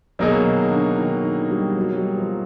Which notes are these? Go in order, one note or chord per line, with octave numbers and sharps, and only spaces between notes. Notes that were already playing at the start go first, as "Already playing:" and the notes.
B2 D#3 F#3 A#3 D#4 G#4
D#3
D3
D#3
D#3
G3
F#3
G3
F3